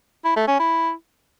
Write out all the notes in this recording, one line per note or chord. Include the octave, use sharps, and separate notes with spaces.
E4
A3
C#4
E4